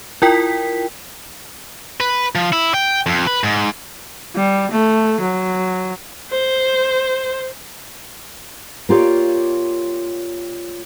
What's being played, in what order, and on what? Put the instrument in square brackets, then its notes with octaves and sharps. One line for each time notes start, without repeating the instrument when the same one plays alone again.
[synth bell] E4 F4 A#4 G5 B6
[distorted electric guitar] B4
F3
E4
G5
F2
B4
G#2
[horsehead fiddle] G3
A3
F#3
[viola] C5
[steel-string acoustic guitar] A#3 F4 G4 C#5 D5